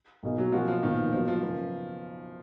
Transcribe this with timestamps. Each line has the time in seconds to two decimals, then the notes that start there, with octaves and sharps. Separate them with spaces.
0.23 B1 B2 A#3 D#4 G#4
0.38 F#3
0.52 B2 F3 A#3 C#4 F#4
0.68 F3
0.83 B1 A#2 D#3 F3 B3
1.12 B1 B2 F3 F#3 A#3
1.28 F3
1.42 F#2 C#3 F#3 B3